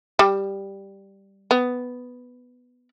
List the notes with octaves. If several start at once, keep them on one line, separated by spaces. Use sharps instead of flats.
G3
B3